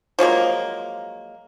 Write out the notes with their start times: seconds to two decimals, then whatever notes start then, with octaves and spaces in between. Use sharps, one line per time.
0.19 F3 F#3 G#3 A#3